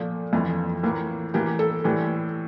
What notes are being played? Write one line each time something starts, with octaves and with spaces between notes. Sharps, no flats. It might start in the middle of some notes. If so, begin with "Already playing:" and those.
Already playing: A#2 F3 A3
F2 E3 A3 F4
A2 E3 A#3
A2 E3 A#3 G4
A4
A2 E3 G3